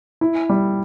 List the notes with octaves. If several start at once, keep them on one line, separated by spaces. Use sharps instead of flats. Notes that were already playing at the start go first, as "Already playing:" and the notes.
E4
G3